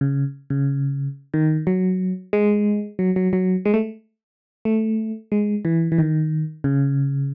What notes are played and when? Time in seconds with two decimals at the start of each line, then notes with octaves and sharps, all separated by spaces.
0.01 C#3
0.50 C#3
1.34 D#3
1.67 F#3
2.33 G#3
2.99 F#3
3.16 F#3
3.33 F#3
3.65 G#3
3.74 A3
4.65 A3
5.32 G#3
5.65 E3
5.92 E3
5.98 D#3
6.64 C#3